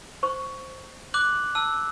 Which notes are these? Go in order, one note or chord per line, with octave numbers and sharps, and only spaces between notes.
C5 C#6
D6 F#6 F#7
A5 E6